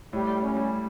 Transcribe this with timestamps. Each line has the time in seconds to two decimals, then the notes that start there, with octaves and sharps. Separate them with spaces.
0.13 A2 G3
0.42 C#4
0.57 G3